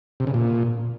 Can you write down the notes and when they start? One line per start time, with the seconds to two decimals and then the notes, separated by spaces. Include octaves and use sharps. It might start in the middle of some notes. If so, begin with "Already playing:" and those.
0.20 C3
0.27 C#3
0.34 A#2